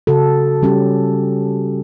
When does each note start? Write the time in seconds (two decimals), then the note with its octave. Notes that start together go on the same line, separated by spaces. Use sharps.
0.07 C#3 F#4 A4
0.62 G3 C#4 G4